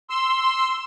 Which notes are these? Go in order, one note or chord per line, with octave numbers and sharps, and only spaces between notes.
C6 E6